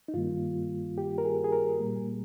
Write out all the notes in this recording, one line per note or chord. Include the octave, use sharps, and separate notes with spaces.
D#4
G2 D#3 G3 A#3 F4
G4
A#4
G#4
G#4
A#4
A#2 G3 A#3